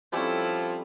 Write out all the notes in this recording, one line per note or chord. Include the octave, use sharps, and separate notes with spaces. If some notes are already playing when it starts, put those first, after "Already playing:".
F3 G3 C4 C#4 E4 A4